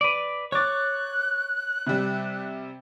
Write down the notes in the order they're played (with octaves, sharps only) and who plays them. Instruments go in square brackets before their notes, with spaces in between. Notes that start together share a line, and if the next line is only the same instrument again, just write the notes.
[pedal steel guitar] B4 D5
[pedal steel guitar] C#5 D6 [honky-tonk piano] C#6 A6 [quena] F#6
[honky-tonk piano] C3 G3